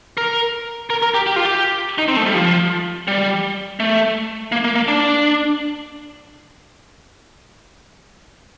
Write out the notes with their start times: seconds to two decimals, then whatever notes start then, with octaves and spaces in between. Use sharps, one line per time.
0.17 A#4
0.90 A#4
1.02 A#4
1.14 G4
1.27 G4
1.36 F4
1.46 G4
1.98 D#4
2.08 C4
2.17 A3
2.26 G3
2.35 F3
3.08 G3
3.80 A3
4.52 A#3
4.65 A#3
4.75 A#3
4.88 D4